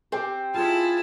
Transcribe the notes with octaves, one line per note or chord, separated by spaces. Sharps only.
C4 G4
E4 F4 G#4 A5